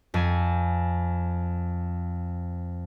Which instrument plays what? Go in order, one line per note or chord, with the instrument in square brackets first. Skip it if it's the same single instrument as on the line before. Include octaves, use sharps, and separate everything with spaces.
[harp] F2 G#5